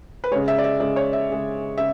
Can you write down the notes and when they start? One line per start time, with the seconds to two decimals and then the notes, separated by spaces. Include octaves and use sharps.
0.24 B4
0.31 G#3 C#5
0.35 C#3
0.48 E5
0.58 D5
0.64 E5
0.80 C#3 G#3 D5
0.96 C#5
1.13 E5
1.30 C#3 G#3
1.78 C#3 E5